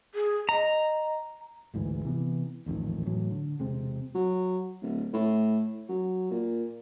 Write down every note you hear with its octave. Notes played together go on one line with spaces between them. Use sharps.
G#4
D#5 A#5
G#1 D2 G#2 E3
C3 E3 B3
D#1 A1 F2 D#3
A2 E3 F#3
D3
E1 C3 G#3 C4
F#3
D1
A2
F#3
A#2